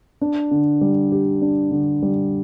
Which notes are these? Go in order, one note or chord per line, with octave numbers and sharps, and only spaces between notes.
D4
D3
G3
G4
D4
D3
G3